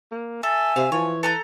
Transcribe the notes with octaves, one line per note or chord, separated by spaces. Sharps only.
A#3
A4 E5 G#5
C3 F5
E3 F3 C#5
A4 B4 A#5 G6